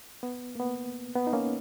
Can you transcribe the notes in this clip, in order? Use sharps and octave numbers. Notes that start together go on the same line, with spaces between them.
B3
A#3
B3
B3
D#4
A#3 C#4